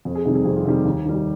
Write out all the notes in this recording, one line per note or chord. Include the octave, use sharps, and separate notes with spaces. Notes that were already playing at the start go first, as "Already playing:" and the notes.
F2
G#4
C3 D#3 G3
G#4
F2 G4
F4
C3 D#3 G3 G4
D#2
D#3 G3
G4